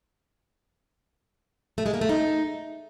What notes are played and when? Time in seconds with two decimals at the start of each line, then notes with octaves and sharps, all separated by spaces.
1.78 A3
1.86 G#3
1.94 A#3
2.01 A3
2.09 D#4